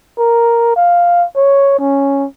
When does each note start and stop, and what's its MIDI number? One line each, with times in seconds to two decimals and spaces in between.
0.18 0.72 70
0.76 1.25 77
1.36 1.78 73
1.79 2.26 61